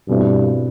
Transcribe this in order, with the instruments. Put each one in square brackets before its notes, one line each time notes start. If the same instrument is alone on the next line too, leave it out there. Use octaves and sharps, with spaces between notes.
[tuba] G2 [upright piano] B2 A3 C4 E4